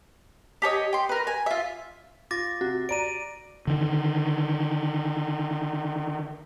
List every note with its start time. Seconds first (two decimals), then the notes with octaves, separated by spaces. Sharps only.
0.62 G4 A4 C#5 D#5
0.93 G5 C6
1.09 A#4 B4
1.27 G#5
1.46 F4 E5
2.31 F4 D6 A6 A#6
2.61 C3 F#4
2.89 D5 A#5 D7 D#7
3.67 D3 D#3